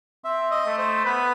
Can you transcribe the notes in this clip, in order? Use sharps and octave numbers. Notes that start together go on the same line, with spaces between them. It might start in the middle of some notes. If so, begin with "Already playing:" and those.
C4 E5
D#5
A3
C5
B3 B4